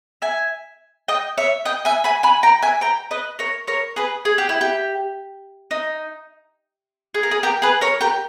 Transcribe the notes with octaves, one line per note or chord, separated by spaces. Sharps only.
E5 G#5
D#5 G5
C#5 E5
D#5 G5
E5 G#5
G#5 B5
G#5 B5
G5 A#5
E5 G#5
G5 A#5
B4 D#5
A#4 C#5
A#4 C#5
G#4 B4
G#4
G4
E4
G4
D#4
G#4
A#4
G#4
G4 A#4
G#4 B4
A#4 C#5
G4 A#4